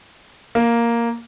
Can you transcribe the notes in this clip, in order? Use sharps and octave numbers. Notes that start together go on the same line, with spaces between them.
A#3